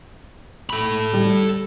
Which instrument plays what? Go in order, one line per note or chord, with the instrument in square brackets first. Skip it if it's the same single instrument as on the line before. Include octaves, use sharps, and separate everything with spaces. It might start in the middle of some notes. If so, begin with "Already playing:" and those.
[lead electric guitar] A4 B5
[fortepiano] G3